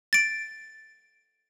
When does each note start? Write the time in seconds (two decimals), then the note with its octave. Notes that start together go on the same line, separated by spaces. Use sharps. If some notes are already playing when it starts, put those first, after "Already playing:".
0.13 A6 D7